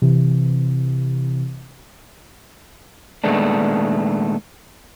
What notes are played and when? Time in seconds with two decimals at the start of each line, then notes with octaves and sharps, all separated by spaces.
0.02 C3 E3
3.24 A#2 D#3 G#3 A3 B3 D4